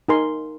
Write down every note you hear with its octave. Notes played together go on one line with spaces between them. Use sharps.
D#4 A#4 G#5 C6